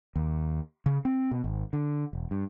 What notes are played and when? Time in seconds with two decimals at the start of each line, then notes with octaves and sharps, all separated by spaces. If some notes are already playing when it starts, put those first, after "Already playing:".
0.16 D#2
0.86 C#3
1.05 C4
1.31 B2
1.44 G#1
1.73 D3
2.13 E1
2.31 G2